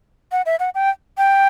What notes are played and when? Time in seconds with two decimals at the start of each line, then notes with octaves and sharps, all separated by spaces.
0.32 F#5
0.46 E5
0.60 F#5
0.75 G5
1.18 G5